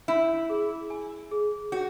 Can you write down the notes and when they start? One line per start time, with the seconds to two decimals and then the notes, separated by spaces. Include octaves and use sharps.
0.08 C#4 E4
0.49 G#4
0.90 G#5
1.31 G#4
1.72 F#4 C#5